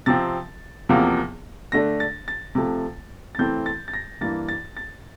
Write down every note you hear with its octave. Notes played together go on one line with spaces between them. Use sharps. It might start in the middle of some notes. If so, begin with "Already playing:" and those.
C3 F3 C4 A6
E2 C3 F3 A#3
D3 A3 D4 A#6
A6
A6
C3 F3 A3
A6
C3 E3 A3 C4 G6
A6
A6
A#6
G2 E3 A#3 A6
A6
A6